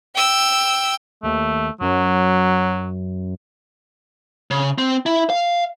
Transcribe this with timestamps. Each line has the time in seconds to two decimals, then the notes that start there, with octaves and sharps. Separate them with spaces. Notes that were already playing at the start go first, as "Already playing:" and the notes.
0.15 G5 E6
1.23 D#2 A3
1.81 F#2 F#3
4.51 C#3
4.78 C4
5.06 E4
5.30 F5